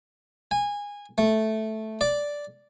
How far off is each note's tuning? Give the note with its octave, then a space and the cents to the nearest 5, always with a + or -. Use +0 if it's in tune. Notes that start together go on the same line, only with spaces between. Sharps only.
G#5 -20
A3 -5
D5 -5